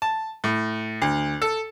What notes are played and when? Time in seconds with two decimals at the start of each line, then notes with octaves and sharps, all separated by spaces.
0.02 A5
0.44 A2
1.02 D2
1.42 A4